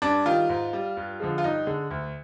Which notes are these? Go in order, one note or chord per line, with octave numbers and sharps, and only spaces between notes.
G2 D4
D#3 G3 F4
G#2
G3
G2
D3 F3 G#3
F4
G2 D#4
D3 G#3
D2